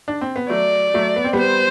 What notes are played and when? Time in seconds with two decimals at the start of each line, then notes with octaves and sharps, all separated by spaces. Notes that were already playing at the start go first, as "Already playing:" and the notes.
0.08 D4
0.21 C4
0.36 B3
0.49 F#3 A3 D5
0.94 F#3 A3
1.16 B3
1.24 C4
1.33 G3 B3 C5